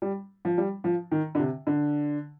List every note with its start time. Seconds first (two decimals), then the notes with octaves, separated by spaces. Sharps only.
0.02 G3
0.45 F3
0.58 G3
0.84 F3
1.11 D#3
1.35 D3
1.39 C3
1.67 D3